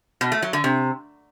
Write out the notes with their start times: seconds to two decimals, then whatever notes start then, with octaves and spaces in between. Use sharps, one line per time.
0.21 B2
0.32 A3
0.42 F#3
0.53 D3
0.64 C3